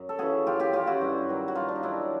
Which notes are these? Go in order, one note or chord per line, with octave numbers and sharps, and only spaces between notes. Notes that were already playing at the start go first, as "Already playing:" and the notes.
Already playing: F#2
A4
C#3 E3 F#4 G#4
F#2 F4 G4
F4 G4
C#3 E3 F4 G4
E4 F#4
G2
D#3 F#3
F#4
G2 D#4 F4
D4
D#4
D#3 F#3 D4 E4